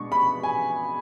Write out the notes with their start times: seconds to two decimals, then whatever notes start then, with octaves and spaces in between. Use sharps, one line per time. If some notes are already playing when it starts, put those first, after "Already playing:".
Already playing: B2 G#3 D4 C#6
0.12 B5
0.43 G#5